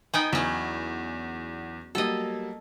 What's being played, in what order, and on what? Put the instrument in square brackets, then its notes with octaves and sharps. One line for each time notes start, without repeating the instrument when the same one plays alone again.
[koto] B3 D#4 G5 [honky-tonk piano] G#5
[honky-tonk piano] E2 [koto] F#3 C#4
[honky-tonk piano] F#3 G3 A#3 [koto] A4 D#5